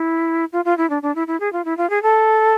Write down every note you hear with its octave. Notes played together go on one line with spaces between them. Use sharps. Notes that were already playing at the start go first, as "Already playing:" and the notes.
Already playing: E4
F4
F4
E4
D4
D4
E4
E4
G#4
F4
E4
F4
G#4
A4